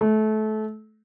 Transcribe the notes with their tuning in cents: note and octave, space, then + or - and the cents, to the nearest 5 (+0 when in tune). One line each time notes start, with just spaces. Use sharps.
A3 -25